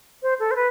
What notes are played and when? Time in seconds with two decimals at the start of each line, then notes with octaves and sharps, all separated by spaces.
0.23 C5
0.40 A4
0.51 C5
0.56 B4